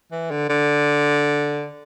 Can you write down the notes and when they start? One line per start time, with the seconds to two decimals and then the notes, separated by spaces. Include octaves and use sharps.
0.12 E3
0.31 D3
0.49 D3